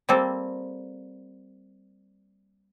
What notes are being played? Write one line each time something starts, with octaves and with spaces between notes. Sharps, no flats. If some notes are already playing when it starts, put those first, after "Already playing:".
G3 A#3 C4 A4